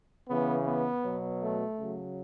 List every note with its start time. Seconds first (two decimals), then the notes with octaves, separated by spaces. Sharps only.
0.28 C#3 E3 B3
0.65 B3
1.03 B2 F#3
1.41 A3
1.78 C#3 F#3